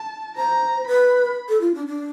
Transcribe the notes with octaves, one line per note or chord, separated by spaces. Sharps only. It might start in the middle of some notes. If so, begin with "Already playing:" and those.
Already playing: A5
C5 A#5
B4 B5
A4
F4
D4
D4